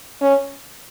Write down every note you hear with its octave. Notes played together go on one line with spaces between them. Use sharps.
C#4